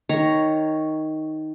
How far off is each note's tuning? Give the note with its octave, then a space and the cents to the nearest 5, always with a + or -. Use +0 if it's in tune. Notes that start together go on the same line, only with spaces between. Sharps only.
D#3 +5 C#5 +0 A#5 +0